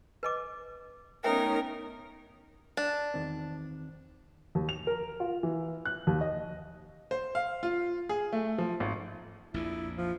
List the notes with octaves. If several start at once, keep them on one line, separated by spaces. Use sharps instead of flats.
B4 D#5 D6
A3 B3 C#4 D#4 A#4 C#5 E5 G5
D4
E2 D#3 C4
D#2
F7
A#4
F4
E3
F#6
D#2
D#5
C5
F5
F4
G#4
A3
F3
G#1
A#1 F2 A#2 E4
F3